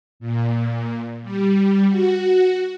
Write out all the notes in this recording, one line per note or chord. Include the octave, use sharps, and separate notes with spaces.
A#2
G3
F#4